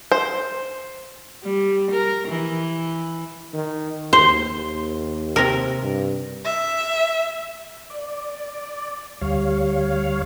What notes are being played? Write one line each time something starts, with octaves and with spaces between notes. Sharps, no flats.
C5
G3
A#4
E3
D#3
D#2 C5
D#2
C3 A#4
G2
E5
D5
D2 G3 C#5 F5